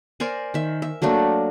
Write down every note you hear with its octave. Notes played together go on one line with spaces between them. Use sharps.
A#4 C5 D5 G#5
D#3 E5
E5
F#3 A3 A#3 D4